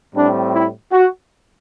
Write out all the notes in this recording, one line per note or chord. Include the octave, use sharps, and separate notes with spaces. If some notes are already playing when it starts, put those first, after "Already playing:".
A2 G3 C4 D4
E4
F#4